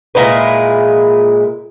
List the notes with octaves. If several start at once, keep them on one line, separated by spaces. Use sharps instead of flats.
A#2 G#3 E4 B4